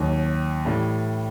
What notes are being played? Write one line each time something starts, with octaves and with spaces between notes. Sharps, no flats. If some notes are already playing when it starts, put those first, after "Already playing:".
Already playing: D#2 D#3 F#3
A2 E3 G3